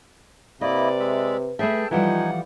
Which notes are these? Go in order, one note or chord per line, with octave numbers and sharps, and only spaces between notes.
C3 A#3 E4 B4 D5 D#5
G#3 E5
A3 G#4 B4 E5 G5 A5
E3 F3 G3 D#4 F4 F#5 G#5